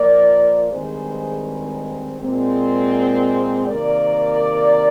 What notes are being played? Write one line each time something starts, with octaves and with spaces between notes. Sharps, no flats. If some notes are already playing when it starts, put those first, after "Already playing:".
Already playing: A#2 F3 A#3 A#4 D5
G2 D#3 G#3 C4 G#4 C5
A#2 G#3 C4
C3 D#3 A#3 A#4 D5